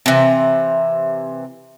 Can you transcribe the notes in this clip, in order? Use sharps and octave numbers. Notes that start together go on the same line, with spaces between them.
C3 E3